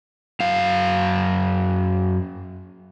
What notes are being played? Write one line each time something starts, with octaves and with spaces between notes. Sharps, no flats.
F#2 F5